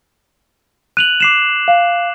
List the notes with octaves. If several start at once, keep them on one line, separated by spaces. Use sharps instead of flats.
F#6 D#7 F7 F#7
D6 C7 E7
F5